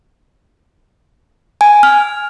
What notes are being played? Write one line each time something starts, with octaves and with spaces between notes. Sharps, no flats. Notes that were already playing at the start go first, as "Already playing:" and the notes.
G#5
F6